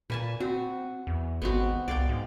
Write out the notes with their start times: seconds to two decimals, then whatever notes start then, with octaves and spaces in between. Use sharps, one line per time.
0.10 A#2 B4 G#5 A5
0.40 C4 F#4
1.07 E2
1.42 G#1 B3 C4 F#4
1.88 C2 D5 F5 G5
2.09 G#2